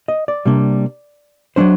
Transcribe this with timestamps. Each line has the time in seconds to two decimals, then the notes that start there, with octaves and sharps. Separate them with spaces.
0.08 D#5
0.28 D5
0.46 C3 G3 A#3 D4
1.56 F#3 A3 D4 C5